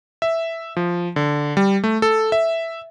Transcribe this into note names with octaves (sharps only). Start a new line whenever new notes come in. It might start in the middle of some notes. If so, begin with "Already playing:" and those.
E5
F3
D3
G3
A3
A4
E5